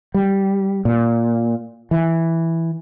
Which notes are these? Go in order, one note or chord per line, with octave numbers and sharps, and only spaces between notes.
G3
A#2
E3